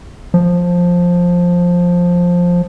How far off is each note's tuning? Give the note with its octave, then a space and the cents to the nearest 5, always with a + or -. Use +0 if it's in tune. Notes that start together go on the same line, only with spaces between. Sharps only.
F3 +10